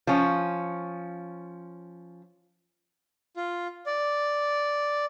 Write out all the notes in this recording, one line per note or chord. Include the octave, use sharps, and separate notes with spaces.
F3 C#4
F4
D5